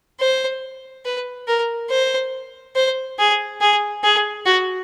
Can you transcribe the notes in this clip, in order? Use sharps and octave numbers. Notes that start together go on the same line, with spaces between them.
C5
B4
A#4
C5
C5
G#4
G#4
G#4
F#4